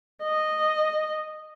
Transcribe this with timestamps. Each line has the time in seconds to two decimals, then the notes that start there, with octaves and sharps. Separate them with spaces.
0.23 D#5